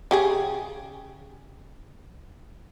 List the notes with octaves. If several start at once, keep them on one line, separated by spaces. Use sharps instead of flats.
C#3 G4 G#4